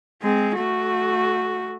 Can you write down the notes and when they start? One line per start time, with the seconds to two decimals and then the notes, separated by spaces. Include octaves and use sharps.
0.22 G#3 C4
0.56 A3 F#4